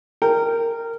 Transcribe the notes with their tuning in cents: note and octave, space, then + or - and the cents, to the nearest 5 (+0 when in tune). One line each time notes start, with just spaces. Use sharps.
A#4 -15 G5 +0